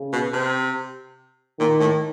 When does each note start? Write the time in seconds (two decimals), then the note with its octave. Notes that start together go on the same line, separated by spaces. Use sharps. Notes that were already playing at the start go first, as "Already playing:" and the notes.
Already playing: C#3
0.13 B2
0.33 C3
1.59 A#2 D#3
1.80 A2